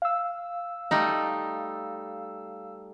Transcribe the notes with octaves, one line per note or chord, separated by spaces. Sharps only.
F5 E6
G3 A3 D#4